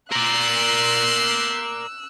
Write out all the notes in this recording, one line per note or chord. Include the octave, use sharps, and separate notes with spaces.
B3 G4 A#4 D5 C6 E6 F#6 F#7